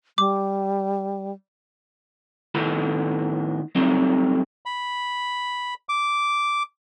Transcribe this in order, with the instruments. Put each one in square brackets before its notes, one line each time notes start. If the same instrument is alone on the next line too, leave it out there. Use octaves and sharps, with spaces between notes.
[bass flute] G3 [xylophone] D6
[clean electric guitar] A2 D#3 B3 A4 B5
F#3 G3 A3 C4 D#4
[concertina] B5
D6